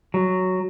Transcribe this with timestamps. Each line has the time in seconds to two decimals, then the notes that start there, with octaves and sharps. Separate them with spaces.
0.14 F#3